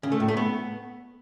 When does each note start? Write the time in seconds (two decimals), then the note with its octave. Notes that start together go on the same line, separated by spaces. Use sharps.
0.03 C#3
0.12 A3
0.20 A2
0.28 A3
0.37 B3